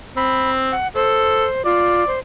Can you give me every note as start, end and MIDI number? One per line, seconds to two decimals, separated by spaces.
0.17 0.73 60
0.17 0.51 83
0.72 0.88 78
0.95 1.47 69
0.95 1.65 72
1.65 2.04 65
1.65 2.13 74
2.07 2.19 72